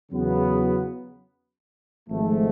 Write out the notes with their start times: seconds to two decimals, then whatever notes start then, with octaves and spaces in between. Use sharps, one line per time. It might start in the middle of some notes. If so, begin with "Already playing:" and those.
0.11 E2 C#3 F#3 B3
2.09 G#1 G#2 F3 A3